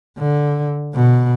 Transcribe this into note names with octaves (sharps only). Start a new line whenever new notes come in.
D3
B2